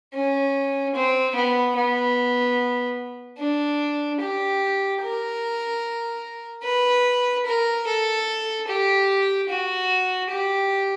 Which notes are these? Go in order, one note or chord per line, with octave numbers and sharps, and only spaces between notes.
C#4
C4
B3
B3
D4
G4
A#4
B4
A#4
A4
G4
F#4
G4